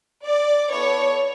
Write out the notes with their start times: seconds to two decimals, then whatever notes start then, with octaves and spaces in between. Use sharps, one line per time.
0.26 D5
0.71 B3 E4 A4 C#5